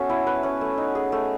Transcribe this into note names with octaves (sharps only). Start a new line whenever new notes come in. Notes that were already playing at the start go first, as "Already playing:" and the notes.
Already playing: B3 C#4 F#4 A4 E5
E4
B4
C#4
A3
D#4
G#4
A3